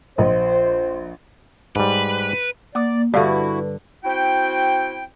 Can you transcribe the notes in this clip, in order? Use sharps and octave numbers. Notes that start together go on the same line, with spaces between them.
A#1 C5 D#5
G#2 G3 B4
A#3 D5 F#5 D6 D#6
G2 D3 E4 F#4 B4 D5 F5
C4 E4 F#4 G5